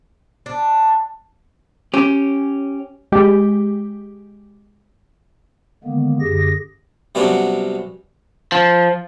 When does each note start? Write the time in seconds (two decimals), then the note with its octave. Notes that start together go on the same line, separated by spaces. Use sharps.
0.46 D4
1.94 C#4 G4
3.12 G#3 G4
5.84 D3 D#3 G#3 A#3 B3
6.20 F#2 D3 G4 G#4 A#6
7.15 C3 F#3 G3 B3 C#4 D4
8.52 F3